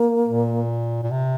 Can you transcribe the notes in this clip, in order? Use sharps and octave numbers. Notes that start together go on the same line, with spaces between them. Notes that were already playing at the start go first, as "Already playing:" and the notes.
Already playing: A#3
A#2
A#2
C3